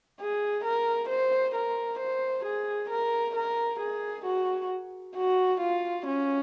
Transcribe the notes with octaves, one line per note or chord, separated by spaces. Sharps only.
G#4
A#4
C5
A#4
C5
G#4
A#4
A#4
G#4
F#4
F#4
F4
C#4